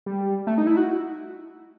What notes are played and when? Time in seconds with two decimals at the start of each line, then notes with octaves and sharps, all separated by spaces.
0.06 G3
0.47 A3
0.58 D#4
0.67 E4
0.77 F#4